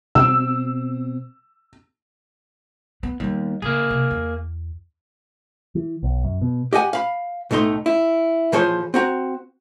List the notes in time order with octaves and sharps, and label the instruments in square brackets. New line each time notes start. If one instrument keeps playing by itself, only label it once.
[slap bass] B2 C4 [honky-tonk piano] E6
[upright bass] B3
[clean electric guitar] D#2 [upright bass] G3 B3
[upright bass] C#3 [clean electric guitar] A#3 G#4
[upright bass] C3
E2
[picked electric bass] E3
B1
F#2
B2
[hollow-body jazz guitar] G4 D#5 F#5 G#5
F5 B5
B1 A2 A3 D#4 C6
E4
A#2 E3 F3 G#4 C5 C#5
C4 F#4 A#5